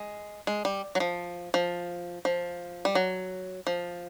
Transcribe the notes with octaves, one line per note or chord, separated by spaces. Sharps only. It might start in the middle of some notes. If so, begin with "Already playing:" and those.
Already playing: G#3
G#3
G3
F#3
F3
F3
F3
G3
F#3
F3